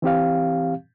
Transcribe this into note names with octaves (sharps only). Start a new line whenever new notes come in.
E3 C4 G4 F5